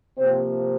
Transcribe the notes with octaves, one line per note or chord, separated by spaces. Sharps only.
C3 F3 A#3 C4 C5